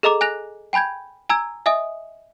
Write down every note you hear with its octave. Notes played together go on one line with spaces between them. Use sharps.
G#4 A4 D#5 A#5 D6
G#5 F#6 A#6 F7
G5 G#5 B5 G6 G#6
G#5 A#5 E6 G#6
D#5 E5 G#5 D#6